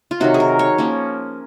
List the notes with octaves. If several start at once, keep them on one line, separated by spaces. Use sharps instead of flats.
F4
C3 D#3 F#3 F#4
G#4
A#4
C#5
F3 A#3 C#4